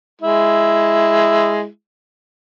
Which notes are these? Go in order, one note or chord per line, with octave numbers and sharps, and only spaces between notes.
G#3 E4